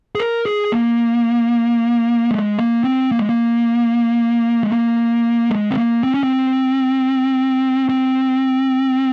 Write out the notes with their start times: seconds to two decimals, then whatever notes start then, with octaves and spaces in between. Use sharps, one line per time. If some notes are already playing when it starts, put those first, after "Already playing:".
0.15 G#4
0.19 A#4
0.45 G#4
0.72 A#3
2.31 G#3
2.58 A#3
2.84 C4
3.12 A#3
3.19 G#3
3.29 A#3
4.63 G#3
4.70 A#3
5.50 G#3
5.71 C4
5.77 A#3
6.04 C4
6.14 C#4
6.23 C4
7.89 C4